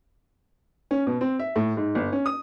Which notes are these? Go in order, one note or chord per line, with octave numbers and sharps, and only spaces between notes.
C#4
B2
C4
E5
A2
G#2
G1
C#4
D#6